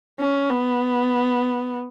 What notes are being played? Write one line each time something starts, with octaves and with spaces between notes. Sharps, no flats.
C#4
B3